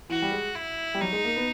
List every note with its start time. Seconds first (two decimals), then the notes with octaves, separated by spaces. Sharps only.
0.09 E3 F#4
0.22 G3
0.32 G#3
0.55 E4
0.95 G3
1.01 F#3 D#4
1.13 G#3
1.25 A#3
1.36 B3